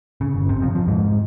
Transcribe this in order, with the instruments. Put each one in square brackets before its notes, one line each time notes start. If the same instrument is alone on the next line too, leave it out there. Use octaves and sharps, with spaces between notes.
[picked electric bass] C#3
G1
C3
F2
F3
G#2